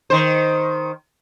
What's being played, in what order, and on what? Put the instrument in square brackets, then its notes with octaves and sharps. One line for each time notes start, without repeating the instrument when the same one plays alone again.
[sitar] D#3 C5